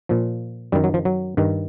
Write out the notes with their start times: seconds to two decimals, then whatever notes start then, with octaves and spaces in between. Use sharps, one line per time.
0.09 A#2 F3
0.72 F#2 D#3 G3
0.84 F#3
0.94 F3
1.05 F#3
1.37 G2 D#3